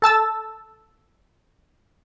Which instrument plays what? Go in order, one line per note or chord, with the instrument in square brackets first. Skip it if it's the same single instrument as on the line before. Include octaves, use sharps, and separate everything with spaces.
[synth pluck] A4 A5 E6 A6